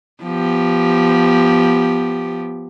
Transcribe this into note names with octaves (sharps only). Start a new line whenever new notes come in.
F3 B3 G4